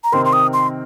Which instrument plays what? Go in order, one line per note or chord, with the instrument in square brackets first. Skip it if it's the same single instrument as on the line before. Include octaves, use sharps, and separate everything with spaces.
[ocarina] A#5
[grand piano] C3 D#3 C4 D#4 A#4 [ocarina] C6
[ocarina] C6
D#6
C6